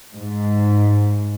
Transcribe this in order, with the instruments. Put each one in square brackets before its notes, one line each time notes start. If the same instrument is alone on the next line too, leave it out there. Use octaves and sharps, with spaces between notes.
[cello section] G#2